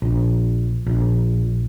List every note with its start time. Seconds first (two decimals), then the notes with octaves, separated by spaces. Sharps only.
0.02 A#1
0.86 A#1